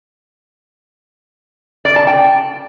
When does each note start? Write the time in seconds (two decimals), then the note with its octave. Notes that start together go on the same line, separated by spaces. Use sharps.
1.85 D5
1.96 A5
2.07 G5